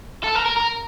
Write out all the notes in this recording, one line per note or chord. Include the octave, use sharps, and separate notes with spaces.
A4
A#4
A#4
A#4